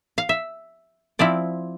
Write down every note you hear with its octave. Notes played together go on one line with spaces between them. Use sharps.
F5
E5
F3 C4 E4 D5